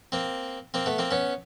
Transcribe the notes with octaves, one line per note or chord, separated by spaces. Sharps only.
A#3 C4
A#3 C4
A3 B3
A#3 C4
B3 C#4